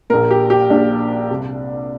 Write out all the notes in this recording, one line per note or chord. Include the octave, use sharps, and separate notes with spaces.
A#1 A#2 A#4
G4
G4
A#1 A#2 D4
C2 C3